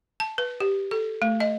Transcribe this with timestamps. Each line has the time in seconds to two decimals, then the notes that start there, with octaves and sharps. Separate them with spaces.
0.20 A5
0.38 B4
0.60 G4
0.91 A4
1.22 A3
1.40 D#5